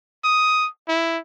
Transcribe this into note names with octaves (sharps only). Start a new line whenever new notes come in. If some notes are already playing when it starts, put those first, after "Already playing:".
D#6
E4